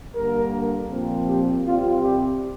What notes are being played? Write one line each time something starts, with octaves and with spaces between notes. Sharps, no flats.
G2 D3 A#3 A#4
A#2 F3 C4
G4
C2 C3 G3 C4 F4
G4